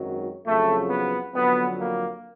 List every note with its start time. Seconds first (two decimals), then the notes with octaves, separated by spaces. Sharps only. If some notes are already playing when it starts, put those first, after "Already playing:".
Already playing: G#1 F#2 D#3 F#3
0.46 F2 C#3 F#3 A3
0.89 B3
1.34 F2 D3 F#3 B3
1.78 A#3